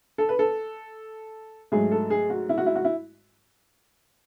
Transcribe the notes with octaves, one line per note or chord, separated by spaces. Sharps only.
A4
B4
A4
G#2 F#3 A3 G#4
A4
G#4
F#4
E4
F#4
E4
F#4
E4